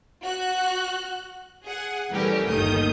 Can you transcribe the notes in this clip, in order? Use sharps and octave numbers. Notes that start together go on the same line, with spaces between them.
F#4 F#6
G#4 F#5
E3 G3 A3 C#4 G4 A#4
G1 D#2 D#3 A3 D#6 G6